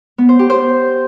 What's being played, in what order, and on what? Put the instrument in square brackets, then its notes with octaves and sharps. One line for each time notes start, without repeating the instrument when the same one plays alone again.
[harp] B3
C5
G4
C5